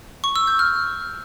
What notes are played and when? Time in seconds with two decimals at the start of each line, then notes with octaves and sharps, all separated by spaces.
0.24 C#6
0.36 E6
0.47 G6
0.59 F6